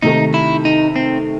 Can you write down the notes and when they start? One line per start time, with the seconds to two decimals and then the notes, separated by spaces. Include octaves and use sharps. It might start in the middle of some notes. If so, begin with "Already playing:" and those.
0.02 C3 D#3 A3 D#4
0.34 E4
0.65 D#4
0.96 C4